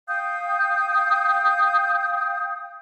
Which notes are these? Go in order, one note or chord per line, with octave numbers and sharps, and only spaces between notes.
F5 G5 D#6 G6